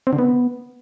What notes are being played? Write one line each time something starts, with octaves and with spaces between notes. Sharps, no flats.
C4
D3
B3